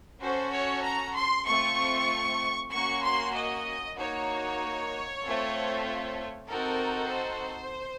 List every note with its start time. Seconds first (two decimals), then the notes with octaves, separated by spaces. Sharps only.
0.21 C#4 F#4 A4 C5
0.52 C#5
0.84 A#5
1.15 C6
1.46 A3 C4 F4 C#6
2.72 A#3 C#4 F#4 C#6
3.03 C6
3.34 D#5
3.97 A#3 D#4 F#4 C#5
5.23 A3 C4 F4 A4
6.48 C4 D#4 F#4 A4 A#4
7.11 C5